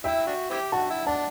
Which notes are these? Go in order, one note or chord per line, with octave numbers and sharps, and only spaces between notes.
E4 E5 G5
D4 F#4
C4 E4 G4
F#4 F#5 A5
E4
D4 F#5 A5